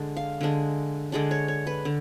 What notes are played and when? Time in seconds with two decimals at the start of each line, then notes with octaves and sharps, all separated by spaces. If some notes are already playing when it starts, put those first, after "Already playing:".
Already playing: D3 G#3 D4 D5
0.17 F5
0.41 D3 G#3 D4
1.12 D3 G#3 D4 D5
1.31 C#5
1.48 C#5
1.67 B4
1.85 D3